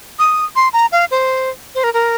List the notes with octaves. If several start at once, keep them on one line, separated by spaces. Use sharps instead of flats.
D#6
C6
A#5
F5
C5
C5
A#4
A#4